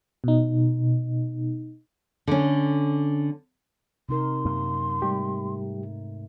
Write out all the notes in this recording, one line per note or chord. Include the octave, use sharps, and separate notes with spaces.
B2 D#4
D3 C#4
C3 D#4 A#4 C6
F#2 A#3
G#2 G3 A3 G4